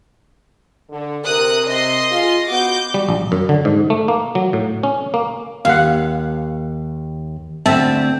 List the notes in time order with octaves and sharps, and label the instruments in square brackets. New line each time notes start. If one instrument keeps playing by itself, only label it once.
[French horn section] D3
[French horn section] C3 A#4 [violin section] D#6 F#6
[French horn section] C3 [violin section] D#5 C6
[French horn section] F4 G#4
[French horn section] B3 F#4 [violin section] D6 G6
[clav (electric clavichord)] G3
A#1
F#2
D3
G#2
A3
A#3
F#3
A2
C#4
A#3
[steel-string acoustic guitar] D#2 [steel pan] F5 F#5
[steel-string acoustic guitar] D2 C4 [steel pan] E5 A5